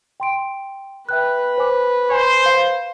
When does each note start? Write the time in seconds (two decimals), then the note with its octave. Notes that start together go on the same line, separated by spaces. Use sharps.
0.20 G5 C6 D7
1.09 B4 E5 G5 F#6
1.58 C5 G#5 D6
2.11 C5 G#5
2.46 F5